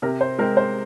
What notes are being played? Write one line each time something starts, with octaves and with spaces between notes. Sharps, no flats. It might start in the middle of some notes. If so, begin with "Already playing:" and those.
C3 A#4
C5
G#3 C4 A#4
C5